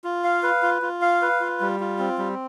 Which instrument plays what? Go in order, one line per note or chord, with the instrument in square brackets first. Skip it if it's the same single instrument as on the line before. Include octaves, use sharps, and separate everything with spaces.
[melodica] F4
F5
B4
F4
F4
F5
B4
F4
G3
F4
C4
G3